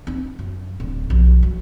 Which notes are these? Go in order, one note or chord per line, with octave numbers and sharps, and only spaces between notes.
C4 D#4
F#2
D1 D2
B1 F3
F#3